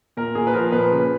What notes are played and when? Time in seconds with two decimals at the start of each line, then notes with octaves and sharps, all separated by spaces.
0.17 A#2 A#4
0.35 A#2 G#4
0.47 B4
0.54 F3 A#4
0.72 A#2 B4
0.92 C#3